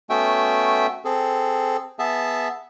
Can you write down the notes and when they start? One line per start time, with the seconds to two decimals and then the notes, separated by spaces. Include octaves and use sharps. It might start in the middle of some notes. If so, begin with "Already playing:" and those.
0.10 A3 B3 C#4 F#4 E5 G5
1.05 C4 G#4 A4
1.99 B3 G#4 E5 A5